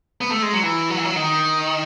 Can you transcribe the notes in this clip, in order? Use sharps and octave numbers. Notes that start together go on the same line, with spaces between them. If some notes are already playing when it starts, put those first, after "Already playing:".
B3
A3
G#3
F#3
E3
F#3
E3
F#3
D#3